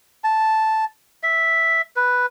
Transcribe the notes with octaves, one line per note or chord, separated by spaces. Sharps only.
A5
E5
B4